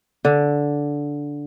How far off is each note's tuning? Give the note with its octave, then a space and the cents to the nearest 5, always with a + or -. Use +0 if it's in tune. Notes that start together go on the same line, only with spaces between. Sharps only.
D3 -10